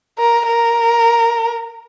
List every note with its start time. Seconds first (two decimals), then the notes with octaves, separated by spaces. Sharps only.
0.18 A#4
0.47 A#4